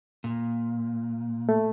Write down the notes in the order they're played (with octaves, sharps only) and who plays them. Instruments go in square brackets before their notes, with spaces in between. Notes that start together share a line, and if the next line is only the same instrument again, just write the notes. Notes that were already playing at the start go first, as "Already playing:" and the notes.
[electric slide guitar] A#2
[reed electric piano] A3